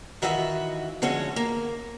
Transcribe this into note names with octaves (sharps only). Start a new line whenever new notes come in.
D#3 E3 F4 F#4 D#5 E5
D3 F3 G#3 C#4 F#4 C#5
A#3